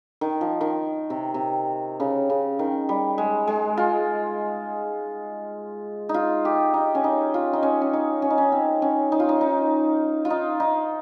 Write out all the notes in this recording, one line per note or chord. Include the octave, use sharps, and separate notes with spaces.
D#3
F3
D#3
C3
C3
C#3
C#3
D#3
G3
G#3
G#3
F4
D#4
F4
G4
D#4
C#4
D#4
F4
D#4
C#4
C#4
D#4
C#4
D#4
C#4
C4
C#4
D#4
F4
D#4
D#4
F4
D#4
D#4